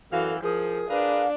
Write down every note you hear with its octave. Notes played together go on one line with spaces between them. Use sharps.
F#2 E3 F#4 A4 F5
F3 G#4 A#4
D4 G#4 A#4 B4 F5